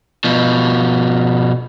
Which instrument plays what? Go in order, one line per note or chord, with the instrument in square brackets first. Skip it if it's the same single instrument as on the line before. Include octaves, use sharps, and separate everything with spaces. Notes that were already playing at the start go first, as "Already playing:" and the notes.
[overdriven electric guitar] B2 F3